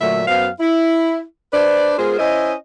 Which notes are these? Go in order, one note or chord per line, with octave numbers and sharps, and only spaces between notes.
A#2 D3 F#3 A3 E5
F#2 B3 C5 F5
E4
D4 B4 C5 D5
G#3 B3 F4 G#4 A#4 C5
C#4 E4 C5 D#5